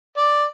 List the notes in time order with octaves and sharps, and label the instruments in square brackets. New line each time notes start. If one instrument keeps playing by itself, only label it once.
[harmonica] D5